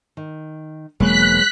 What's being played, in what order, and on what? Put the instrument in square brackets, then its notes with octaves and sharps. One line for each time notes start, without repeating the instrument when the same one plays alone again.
[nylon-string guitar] D#3
[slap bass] E1 A#3 [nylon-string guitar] F#3 G#3 B4 [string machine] F#6 B6